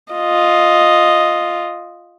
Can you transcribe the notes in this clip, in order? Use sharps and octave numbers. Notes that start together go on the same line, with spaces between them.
F4 D#5